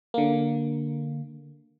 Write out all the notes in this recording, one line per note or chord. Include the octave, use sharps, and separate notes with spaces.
D3 A#3